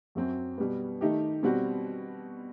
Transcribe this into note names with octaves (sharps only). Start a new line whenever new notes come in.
F#2 F#3 C4
B2 G3 B3
D#3 A3 D#4 G4
B2 G3 C4 F#4